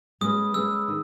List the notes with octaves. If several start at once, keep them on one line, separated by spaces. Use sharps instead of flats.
G#3 C#4 G#4 B4 D#6
G#3 C#4 G#4 B4 E6
D#3